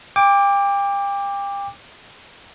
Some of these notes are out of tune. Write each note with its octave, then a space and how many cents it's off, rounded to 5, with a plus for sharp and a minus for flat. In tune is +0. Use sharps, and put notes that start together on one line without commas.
G5 +35 D6 +0